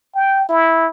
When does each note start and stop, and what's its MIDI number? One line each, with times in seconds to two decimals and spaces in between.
0.15 0.45 79
0.49 0.88 64